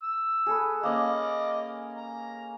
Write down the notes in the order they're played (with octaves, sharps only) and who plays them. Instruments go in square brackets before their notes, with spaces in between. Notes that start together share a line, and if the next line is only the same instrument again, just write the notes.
[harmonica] E6
[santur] G#4 A4 B4
[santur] A#3 C#4 [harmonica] D#5 D6
[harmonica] A#5